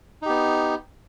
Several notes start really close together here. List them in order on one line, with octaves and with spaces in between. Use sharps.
D#4 G4 B3